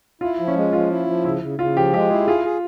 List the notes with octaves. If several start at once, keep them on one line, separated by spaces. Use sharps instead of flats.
E4 F4
F3
C#4
G#3
F3 F4
E4
F3
C#3 E4
C#3
C#3 F4
F3 G4
G#3 G4
E4 G#4
F4 G#4
G#4